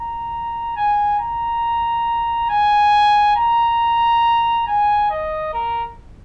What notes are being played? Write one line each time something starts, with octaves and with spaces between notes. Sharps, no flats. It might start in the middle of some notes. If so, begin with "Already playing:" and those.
Already playing: A#5
G#5
A#5
G#5
A#5
G#5
D#5
A#4